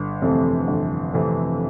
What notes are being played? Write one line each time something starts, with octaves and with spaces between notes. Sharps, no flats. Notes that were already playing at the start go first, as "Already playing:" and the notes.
Already playing: G1
F2 C3 E3 A3
G1
F2 C3 E3 A3